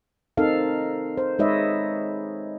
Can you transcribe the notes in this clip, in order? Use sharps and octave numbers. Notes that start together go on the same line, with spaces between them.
C4 D#4 A4 A#4 F5
C5
G#3 D#4 B4 C#5 D#5 E5